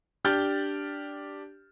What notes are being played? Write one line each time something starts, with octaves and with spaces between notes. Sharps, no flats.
D4 G4 F6 G6 A6 G7